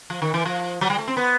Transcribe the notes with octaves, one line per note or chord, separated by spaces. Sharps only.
F3
D#3
E3
F3
F#3
G3
A3
C4
B3